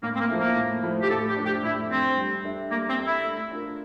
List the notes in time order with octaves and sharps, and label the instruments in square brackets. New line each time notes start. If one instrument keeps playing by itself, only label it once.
[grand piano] A2 [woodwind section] A#3
[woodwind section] C4
A#3
[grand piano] F3 A3 E4
[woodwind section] A#3
[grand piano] A2
F3 A3 E4
[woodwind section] G4
[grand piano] A2 [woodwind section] A4
[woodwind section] G4
[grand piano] F3 A3 D4
[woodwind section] G4
[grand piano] A2 [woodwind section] E4
[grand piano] F3 A3 D4 [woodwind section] C4
[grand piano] G3
D4 A4 E5
[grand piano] G3 [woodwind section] A#3
[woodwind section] C4
[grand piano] D4 A4 E5
[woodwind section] E4
[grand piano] A3
D4 F4 A#4